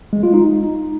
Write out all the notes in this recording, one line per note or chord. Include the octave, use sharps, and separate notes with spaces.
G#3
F4
D#4